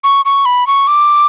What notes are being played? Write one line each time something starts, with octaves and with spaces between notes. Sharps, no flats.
C#6
C#6
B5
C#6
D6